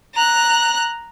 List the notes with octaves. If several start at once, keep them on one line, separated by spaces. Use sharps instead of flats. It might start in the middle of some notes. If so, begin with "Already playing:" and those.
A#5 F#6